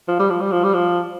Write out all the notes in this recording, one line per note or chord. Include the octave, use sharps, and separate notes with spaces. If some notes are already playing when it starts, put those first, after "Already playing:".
F3
G3
F3
G3
F3
G3
F3